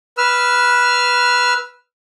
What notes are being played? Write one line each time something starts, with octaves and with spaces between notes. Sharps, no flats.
B4 E6 F6